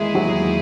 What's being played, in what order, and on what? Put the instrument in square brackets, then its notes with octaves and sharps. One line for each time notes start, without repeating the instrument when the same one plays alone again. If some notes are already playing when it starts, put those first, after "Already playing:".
Already playing: [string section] E2 D#3 A#3 E4 G#4 [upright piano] G#3
[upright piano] F#3